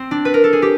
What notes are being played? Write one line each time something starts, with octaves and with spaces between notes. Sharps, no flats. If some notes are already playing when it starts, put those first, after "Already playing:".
Already playing: C4
D4
B4
A#4
A4
G#4
G4